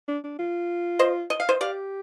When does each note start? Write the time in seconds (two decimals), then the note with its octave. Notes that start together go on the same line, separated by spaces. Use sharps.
0.08 D4
0.24 D4
0.39 F4
0.99 C5 D#5
1.30 D#5
1.40 F5
1.49 C5 D#5
1.61 G4 D5 F5